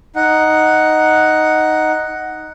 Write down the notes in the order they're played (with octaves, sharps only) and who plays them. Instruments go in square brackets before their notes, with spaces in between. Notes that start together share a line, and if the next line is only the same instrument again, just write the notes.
[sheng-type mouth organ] D#4 F#5